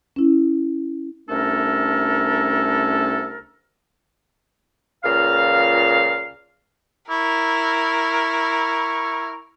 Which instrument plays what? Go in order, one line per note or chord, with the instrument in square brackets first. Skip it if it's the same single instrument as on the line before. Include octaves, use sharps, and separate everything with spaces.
[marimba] C#4 E4
[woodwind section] C2 A3 C#4 D4 A4 A#4
C#2 A#2 F5
[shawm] E4 [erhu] A#4 [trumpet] C#6